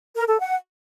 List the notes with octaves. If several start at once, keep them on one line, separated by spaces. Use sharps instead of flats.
A#4
A4
F#5